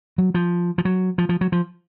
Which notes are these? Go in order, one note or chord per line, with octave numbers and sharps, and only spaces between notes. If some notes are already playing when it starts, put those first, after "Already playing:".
F#3
F3
F3
F#3
F3
F3
F#3
F3